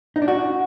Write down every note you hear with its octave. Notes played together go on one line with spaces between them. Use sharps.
D#4
D4
F#4